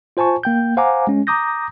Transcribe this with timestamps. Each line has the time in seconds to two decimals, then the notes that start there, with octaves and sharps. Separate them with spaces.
0.17 F4 C5 G#5 A5 C#6
0.43 A#3 G5 G6
0.77 C5 F5 F#5 G#5 A#5 D6
1.07 G#3 C#4
1.27 A#5 D6 D#6 G6 A#6